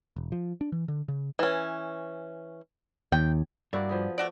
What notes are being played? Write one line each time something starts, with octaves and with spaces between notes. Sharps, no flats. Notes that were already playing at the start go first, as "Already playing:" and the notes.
E1
F3
D4
E3
D3
C#3
E3 C#4
D#2 G5
G2 A#3 E4 F#4 D5
F3 B3 G#4
A3 F#4 D5